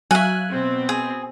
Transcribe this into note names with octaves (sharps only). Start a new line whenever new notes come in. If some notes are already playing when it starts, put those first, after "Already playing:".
F#3 E5 F5 G#5 F#6
B2 C4
G#4